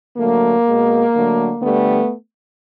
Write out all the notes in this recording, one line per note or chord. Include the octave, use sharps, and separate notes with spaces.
D3 F#3 A3 A#3
B2 G#3
D3 F#3 A3
D3 G3 A3 B3